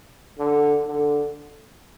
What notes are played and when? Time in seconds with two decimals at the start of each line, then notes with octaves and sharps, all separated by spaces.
0.38 D3
0.87 D3